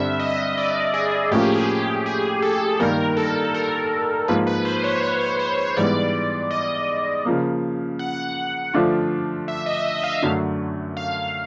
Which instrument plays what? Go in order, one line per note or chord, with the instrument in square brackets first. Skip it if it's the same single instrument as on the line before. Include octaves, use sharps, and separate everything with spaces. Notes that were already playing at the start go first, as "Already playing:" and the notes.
Already playing: [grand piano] G2 D3 G3 C4 [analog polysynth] E5
[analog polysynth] D#5
D5
G#4
[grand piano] A2 F3 A#3 C#4 F4 [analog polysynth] G4
[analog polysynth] G#4
G4
G4
G#4
A4
[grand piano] G2 D#3 G3 A#3 [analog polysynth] A#4
[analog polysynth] A4
A#4
[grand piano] G#2 F3 A#3 [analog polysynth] B4
[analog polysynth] B4
C5
C#5
C5
C5
C#5
C#5
[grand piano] G#2 E3 G3 B3 [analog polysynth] D5
[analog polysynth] D#5
[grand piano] C#3 F3 A#3
[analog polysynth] F#5
[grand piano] D3 F3 A3 D4 F4
[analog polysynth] E5
D#5
E5
F5
[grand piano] F#2 D3 F#3 A3
[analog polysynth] F5